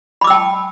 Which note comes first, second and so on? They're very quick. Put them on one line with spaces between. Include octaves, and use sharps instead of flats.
B5 D6 E6 G5 A5